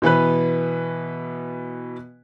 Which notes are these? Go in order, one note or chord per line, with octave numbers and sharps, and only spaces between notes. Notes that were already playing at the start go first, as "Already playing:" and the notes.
B2 E3 B3 B4